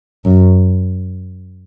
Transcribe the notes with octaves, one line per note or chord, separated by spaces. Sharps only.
F#2